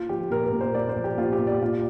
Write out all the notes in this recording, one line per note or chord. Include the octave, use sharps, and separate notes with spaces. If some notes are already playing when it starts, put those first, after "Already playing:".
Already playing: A#3 F4
F3 G4
A#2 A#4
A#4
A#2
C5
A#3 D5
C5
F3
G4
A#2 F4
G4
A#2
D5
A#3 F4